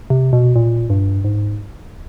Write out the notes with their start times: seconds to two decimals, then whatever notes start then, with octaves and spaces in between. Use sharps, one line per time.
0.10 C3
0.33 B2
0.56 A#2
0.90 G2
1.24 G#2